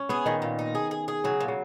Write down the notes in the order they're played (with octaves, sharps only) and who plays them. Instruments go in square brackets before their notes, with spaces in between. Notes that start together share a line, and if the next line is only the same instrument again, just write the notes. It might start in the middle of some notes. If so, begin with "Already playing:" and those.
Already playing: [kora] C#4
[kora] B3 [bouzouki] G#4
[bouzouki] A#2 [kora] D#3
[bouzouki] A#2
D#4
G#4
G#4
G#4
[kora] C#3 [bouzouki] F#3
[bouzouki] A#2
[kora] C#3